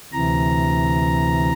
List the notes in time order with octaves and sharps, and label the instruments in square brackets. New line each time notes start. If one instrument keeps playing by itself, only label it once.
[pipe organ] D2 C3 E3 A#5